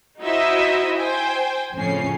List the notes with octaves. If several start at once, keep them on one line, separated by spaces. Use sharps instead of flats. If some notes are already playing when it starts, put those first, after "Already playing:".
D#4 E4 F#4 C5 D#5 E5
C5 G5 G#5
F2 A2 C#3 C#4 C7